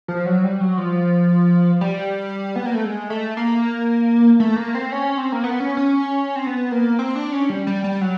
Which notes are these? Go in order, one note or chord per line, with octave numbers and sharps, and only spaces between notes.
F3
F#3
G3
F#3
F3
G3
B3
A#3
A3
G#3
A3
A#3
A3
A#3
C4
C#4
C4
A#3
B3
C#4
C#4
C4
B3
A#3
C4
D4
C#4
G3
G3
G3
F#3